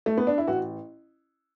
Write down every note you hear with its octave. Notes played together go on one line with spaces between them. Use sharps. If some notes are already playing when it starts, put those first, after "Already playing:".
A3
B3
D4
E4
A1 F#4